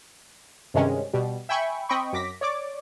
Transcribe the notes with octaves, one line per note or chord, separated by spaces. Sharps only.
G2 C3 D#3 G#3 C#4
B2 G3
E5 G5 G#5 B5 C#6
C4 D#5 G5 B5 C#6
F#2 D6 A#6 B6
C#5 D5 D6